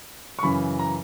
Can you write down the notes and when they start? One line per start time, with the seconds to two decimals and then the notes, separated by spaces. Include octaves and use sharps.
0.39 C#6
0.42 F#2 C#3 E3 B5
0.79 A#5